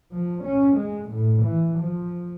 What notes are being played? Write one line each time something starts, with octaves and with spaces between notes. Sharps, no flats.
F3
C#4
G#3
A2
E3
F3